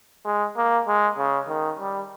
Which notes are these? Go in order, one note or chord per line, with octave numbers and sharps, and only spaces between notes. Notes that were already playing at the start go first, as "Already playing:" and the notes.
G#3
A#3
G#3
C#3
D#3
G3